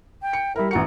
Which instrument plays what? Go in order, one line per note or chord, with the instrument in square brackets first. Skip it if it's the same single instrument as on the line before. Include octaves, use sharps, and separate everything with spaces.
[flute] G5
[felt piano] C#7
[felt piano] G3 A#4 [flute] E4
[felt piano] A1 A#5 C#7 [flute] F#4